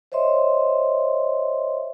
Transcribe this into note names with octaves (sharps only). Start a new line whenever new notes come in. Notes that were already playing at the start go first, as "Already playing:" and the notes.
C5 C#5 D#5 E5 C6